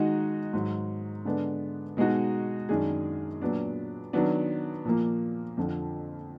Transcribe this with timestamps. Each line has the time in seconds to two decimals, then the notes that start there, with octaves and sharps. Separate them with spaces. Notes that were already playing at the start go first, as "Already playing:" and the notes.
Already playing: D#3 G#3 D#4 F#4
0.53 G#2 D#3 F#3
1.25 D3 G#3 B3 D4
1.97 B2 G#3 D#4 F#4
2.69 F#2 D#3 G#3 D4 G#4
3.42 A#2 F#3 B3 D4
4.13 D#3 F#3 B3 D4
4.85 A#2 F3 A#3
5.57 F2 D3 F3